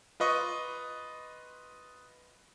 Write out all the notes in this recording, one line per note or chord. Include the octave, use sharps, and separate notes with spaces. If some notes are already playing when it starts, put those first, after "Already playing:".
F4 B4 D#5 C#6